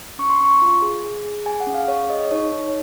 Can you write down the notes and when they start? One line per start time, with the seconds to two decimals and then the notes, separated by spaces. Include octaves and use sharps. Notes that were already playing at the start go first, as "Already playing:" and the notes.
0.19 C#4 C#6
0.30 C6
0.40 C#4 C#6
0.51 C6
0.62 F4
0.82 G#4
1.04 G#4
1.25 G#4
1.46 G#4 G#5
1.60 F#5
1.67 C#4
1.74 F5
1.88 G#4 C#5
2.09 G#4 D#5
2.31 D#4 C#5
2.52 D#4